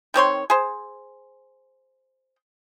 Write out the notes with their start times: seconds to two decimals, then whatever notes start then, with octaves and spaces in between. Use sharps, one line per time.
0.14 D#3 C4 C#5 C6
0.50 G#4 C5